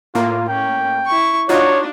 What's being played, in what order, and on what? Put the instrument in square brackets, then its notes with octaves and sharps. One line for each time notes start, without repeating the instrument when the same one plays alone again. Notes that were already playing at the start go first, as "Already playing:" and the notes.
[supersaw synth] A2 A#3 [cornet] F4
[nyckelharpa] C#4 [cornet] G5
[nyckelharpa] E4 C#6
[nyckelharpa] D4 [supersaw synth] D#4 F4 F#4 [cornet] C#5